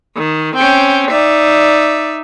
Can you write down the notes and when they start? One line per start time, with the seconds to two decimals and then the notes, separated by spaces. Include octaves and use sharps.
0.16 D#3
0.56 C4 C#4 G5
1.11 D#4 D5 E5